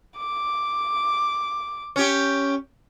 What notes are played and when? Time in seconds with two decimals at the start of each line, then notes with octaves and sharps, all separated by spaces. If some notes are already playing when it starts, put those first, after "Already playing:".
0.17 D6
1.96 C#4 G4